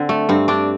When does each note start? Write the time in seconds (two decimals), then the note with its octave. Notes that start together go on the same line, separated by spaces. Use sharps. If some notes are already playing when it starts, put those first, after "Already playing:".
Already playing: D3 C4
0.09 A3
0.29 G2 C4
0.48 C4 D4